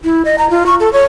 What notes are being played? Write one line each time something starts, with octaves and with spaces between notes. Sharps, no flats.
E4
D#5
A#5
F4
C#6
A4
C#5